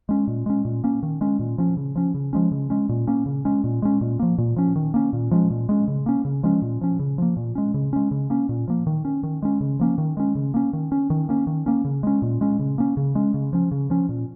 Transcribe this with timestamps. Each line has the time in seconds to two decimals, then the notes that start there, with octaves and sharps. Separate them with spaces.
0.09 G#3 C#4
0.27 A#2
0.46 G#3 C#4
0.65 A#2
0.84 A#3 C#4
1.03 D#3
1.21 G#3 C#4
1.39 A#2
1.58 F3 C#4
1.77 C#3
1.96 F3 C#4
2.14 C#3
2.33 F3 G#3 C#4
2.51 C#3
2.70 G#3 C#4
2.89 A#2
3.07 A#3 C#4
3.26 C#3
3.45 G#3 C#4
3.64 A#2
3.82 G#3 C#4
4.01 A#2
4.19 F3 A#3
4.38 A#2
4.56 F3 C#4
4.76 D#3
4.94 A#3 C#4
5.13 A#2
5.31 F3 G#3 C#4
5.50 A#2
5.69 G#3 C#4
5.88 C#3
6.06 A#3 C#4
6.25 C#3
6.43 F3 G#3 C#4
6.62 A#2
6.81 F3 C#4
6.99 C#3
7.18 F3 A#3
7.37 A#2
7.55 G#3 C#4
7.74 C#3
7.93 G#3 C#4
8.11 C#3
8.30 A#3 C#4
8.49 A#2
8.68 F3 A#3
8.87 D#3
9.05 C#4
9.23 D#3
9.42 G#3 C#4
9.61 C#3
9.80 F3 A#3 C#4
9.98 D#3
10.17 G#3 C#4
10.35 C#3
10.54 A#3 C#4
10.73 D#3
10.92 C#4
11.10 D#3
11.29 A#3 C#4
11.47 D#3
11.66 A#3 C#4
11.85 C#3
12.03 G#3 C#4
12.22 A#2
12.41 G#3 C#4
12.59 C#3
12.78 A#3 C#4
12.97 C#3
13.15 G#3 C#4
13.34 C#3
13.53 F3 C#4
13.71 C#3
13.90 F3 C#4
14.09 A#2